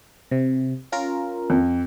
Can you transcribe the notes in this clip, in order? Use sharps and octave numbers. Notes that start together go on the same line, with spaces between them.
C3
C#4 F4 A#4
F2